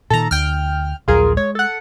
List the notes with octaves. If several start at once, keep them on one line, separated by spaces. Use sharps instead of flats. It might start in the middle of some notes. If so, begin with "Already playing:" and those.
A#2 D#3 A4 A#5
D2 G5 F6
A#1 D#2 F#3 F4 G#4 A#4
G#3 C#5
A4 F#5